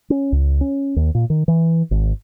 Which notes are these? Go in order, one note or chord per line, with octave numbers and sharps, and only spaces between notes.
C#4
C#2
C#4
D#2
A#2
D#3
E3
G#1